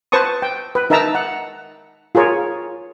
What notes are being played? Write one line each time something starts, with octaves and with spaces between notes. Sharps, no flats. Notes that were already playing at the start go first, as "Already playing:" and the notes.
B4 C5 A5 C#6 D#6
G5
B4
D#4 A#4 E5 A5 A#5 E6
F#5
F4 G#4 A#4 C#5